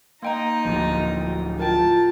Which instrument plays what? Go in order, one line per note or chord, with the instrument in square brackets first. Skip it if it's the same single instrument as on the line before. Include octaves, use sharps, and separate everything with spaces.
[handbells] A#3 G5 A#5 [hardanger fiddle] D#4 D#5
[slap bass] D1 D2 F3
[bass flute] F4 [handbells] A#4 G5 [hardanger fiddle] A5